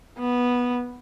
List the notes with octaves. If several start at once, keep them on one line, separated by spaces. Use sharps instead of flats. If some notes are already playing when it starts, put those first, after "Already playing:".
B3